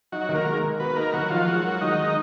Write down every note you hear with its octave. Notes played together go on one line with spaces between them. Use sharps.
F#3 D#4 F#4
D#3
A#3 A#4
G#3
D#3
B3 F#4 B4
A#3 D#4 A#4
D#3 F#3 F#4
F3 D#4 F4
F#3 G#3 F#4
A#4
D#3 G#3 D#4
G#3